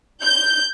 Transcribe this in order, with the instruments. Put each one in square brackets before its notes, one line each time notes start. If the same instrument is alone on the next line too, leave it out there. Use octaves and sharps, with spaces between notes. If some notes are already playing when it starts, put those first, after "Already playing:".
[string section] G6